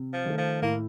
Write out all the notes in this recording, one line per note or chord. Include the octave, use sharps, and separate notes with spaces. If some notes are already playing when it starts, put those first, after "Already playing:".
Already playing: C3
F3
D#3 A3
F3
A2 A#3